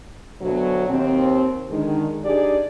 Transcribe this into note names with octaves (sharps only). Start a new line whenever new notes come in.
D2 B2 F#3
D#2 C4
D3 D#3 G#3
D4 D#4 G4 G#4 D5